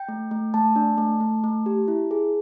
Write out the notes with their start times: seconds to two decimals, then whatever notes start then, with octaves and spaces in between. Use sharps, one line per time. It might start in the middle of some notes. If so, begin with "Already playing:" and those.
Already playing: G5
0.08 A3
0.31 A3
0.54 A3 A5
0.76 D4
0.98 A3
1.20 A3
1.44 A3
1.66 G4
1.88 E4
2.11 G#4